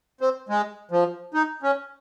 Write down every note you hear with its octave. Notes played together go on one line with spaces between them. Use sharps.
C4
G#3
F3
D#4
C#4